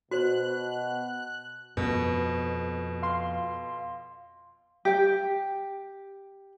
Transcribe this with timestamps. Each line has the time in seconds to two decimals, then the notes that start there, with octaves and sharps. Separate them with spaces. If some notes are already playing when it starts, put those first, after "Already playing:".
0.11 B2 F#4 C5 F#6
1.77 F2 B2
3.02 F5 C6
4.85 G4 G5